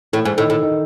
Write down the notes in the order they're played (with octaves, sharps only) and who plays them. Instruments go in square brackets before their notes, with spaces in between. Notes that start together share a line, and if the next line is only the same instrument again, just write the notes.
[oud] A2 [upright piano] E3 E4
[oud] G#2
[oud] A2 [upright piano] D#3 D#4
[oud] A2
[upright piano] D#3 D#4